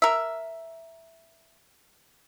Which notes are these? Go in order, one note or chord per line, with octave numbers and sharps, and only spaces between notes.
A#4 E5